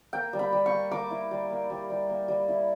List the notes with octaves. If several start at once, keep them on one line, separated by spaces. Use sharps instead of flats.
A#3 G5
G3
B5
G3
C#6
A#3
A#3 D6
E4
G3
A#3
G3
G3
A#3
G3
E4